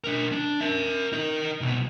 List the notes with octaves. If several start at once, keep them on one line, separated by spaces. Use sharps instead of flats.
D4 A#4
D4
A#4 E5
D#4 A#4
C2 B2